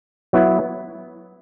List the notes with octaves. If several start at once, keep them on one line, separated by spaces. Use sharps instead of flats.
F#3 B3 E4